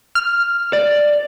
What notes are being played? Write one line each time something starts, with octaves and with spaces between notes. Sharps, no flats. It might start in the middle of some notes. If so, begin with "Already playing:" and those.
F6
D5